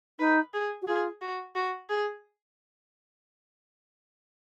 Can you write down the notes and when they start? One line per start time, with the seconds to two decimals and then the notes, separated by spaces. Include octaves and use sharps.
0.19 D#4 B4
0.54 G#4
0.82 F#4
0.87 F4 G#4
1.21 F#4
1.55 F#4
1.89 G#4